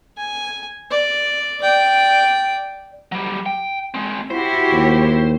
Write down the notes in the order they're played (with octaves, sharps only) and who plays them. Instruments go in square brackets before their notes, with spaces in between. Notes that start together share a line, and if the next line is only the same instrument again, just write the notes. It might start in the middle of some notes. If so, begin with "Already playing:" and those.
[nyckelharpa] G#5
D5
D5 G5
[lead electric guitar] F#3 G3
G5
G#3 C4
[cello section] E4 F#4 G4 [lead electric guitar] C5
[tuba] D#2